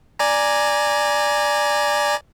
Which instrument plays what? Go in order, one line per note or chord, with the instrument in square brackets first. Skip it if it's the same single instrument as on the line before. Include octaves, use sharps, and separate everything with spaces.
[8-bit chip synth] D5 G#5 A#5